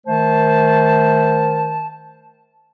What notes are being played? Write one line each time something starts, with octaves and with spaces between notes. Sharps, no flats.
D#3 A3 C5 A5